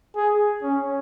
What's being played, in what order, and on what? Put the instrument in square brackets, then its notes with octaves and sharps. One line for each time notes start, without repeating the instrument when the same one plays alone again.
[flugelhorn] G#4
C#4